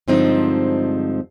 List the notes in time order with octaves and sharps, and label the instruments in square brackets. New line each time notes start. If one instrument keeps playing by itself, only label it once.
[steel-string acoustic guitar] G2 D3 F3 G#3 C4 D#4